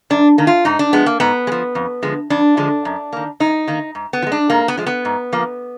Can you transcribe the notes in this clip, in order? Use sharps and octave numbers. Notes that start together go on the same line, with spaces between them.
F#2 D4
D#3 A#3
F4
G#2 D#4
D4
F3 G#3 B3
A#3
G#2 B3
G#3
F3
F2
D3 F3 G#3
F2 D4
D3 F3 G#3
F#2
D#3 A#3
F#2 D#4
D#3 A#3
G#2
B3
F3
G#3
D4
G#2 A#3
B3
F3 G#3
B3
G#2
F3 A#3